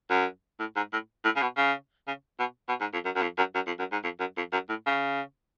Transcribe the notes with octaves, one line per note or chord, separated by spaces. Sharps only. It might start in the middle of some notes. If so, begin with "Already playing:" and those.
F#2
A2
G#2
A2
A2
C#3
B2
C#3
C#3
B2
B2
G#2
F2
F#2
F#2
F2
F#2
F#2
F2
F#2
G#2
F2
F#2
F2
F#2
A2
C#3